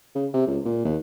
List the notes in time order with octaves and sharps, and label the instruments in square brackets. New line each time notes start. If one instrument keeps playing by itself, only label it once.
[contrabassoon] C#3
C3
C#2
A#2
D#2